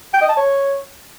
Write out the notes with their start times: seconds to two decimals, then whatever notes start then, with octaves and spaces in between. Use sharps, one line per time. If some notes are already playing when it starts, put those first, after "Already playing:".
0.14 G5
0.21 D#5
0.29 A5
0.37 C#5